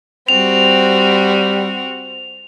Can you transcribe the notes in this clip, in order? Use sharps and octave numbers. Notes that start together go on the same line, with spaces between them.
G3 C4 F#4 F7